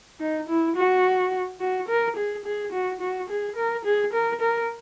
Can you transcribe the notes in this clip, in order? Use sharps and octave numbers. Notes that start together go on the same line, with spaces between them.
D#4
E4
F#4
F#4
A#4
G#4
G#4
F#4
F#4
G#4
A#4
G#4
A#4
A#4